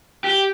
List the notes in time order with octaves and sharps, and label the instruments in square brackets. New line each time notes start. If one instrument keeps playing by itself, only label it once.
[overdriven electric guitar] G4